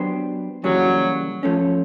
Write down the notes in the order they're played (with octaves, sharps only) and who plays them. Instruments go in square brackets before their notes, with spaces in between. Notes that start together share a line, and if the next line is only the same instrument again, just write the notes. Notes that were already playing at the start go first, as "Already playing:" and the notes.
Already playing: [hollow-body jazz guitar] F#3 B3 D4 G4 C5
[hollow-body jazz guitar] C#3 E3 G3 A#3 [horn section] F#3
[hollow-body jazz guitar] F3 A3 C#4